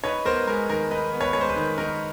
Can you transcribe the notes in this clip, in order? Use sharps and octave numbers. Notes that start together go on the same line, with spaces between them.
D#4 B4 C#5
B3 A#4 C5
G#3 A#4
D#3 A#4
D#4 B4
B3
B4 C#5
G#3 C#5
C5
B4
D#3
D#4 A#4